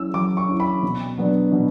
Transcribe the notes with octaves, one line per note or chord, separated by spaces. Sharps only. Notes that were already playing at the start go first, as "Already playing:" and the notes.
Already playing: F#3 C#4 E4 E6
F#3 D6
C#6
C#4 E4
B5
B2
F#3 B3 D4
B2